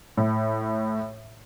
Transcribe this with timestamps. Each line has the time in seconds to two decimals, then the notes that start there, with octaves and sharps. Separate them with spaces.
0.17 A2